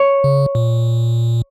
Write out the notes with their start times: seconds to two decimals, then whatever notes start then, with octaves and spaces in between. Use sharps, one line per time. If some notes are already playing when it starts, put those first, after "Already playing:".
Already playing: C#5
0.24 C#3
0.55 A#2